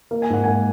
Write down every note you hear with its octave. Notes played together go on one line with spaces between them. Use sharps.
A#3
G#5
G#2 F#5
A#3 G#5